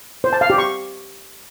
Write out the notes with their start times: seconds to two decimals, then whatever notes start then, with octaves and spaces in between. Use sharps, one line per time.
0.24 C5
0.33 A5
0.41 F5
0.50 G4
0.58 C#6